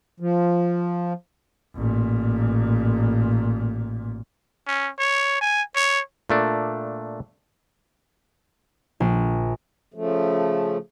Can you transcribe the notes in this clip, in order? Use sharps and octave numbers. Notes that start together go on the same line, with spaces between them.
F3
A1 A#2
C#4
C#5
G#5
C#5
A#2 A3 D4
A#1
C#3 F3 A3